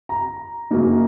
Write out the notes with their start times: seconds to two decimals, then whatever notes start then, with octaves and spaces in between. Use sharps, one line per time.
0.09 A#5
0.71 F#2 C#3 F#3 A#3 D#4